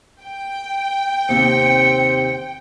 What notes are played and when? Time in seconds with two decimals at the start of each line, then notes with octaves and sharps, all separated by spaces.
0.23 G5
1.29 D#2 C3 C4 C#7